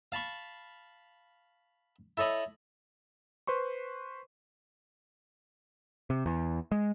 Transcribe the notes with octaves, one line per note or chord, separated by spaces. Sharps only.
F5 A5 B5 C#6
E4 A4 C#5 D#5 B5
B4 C5 C6 C#6
C3
E2
G#3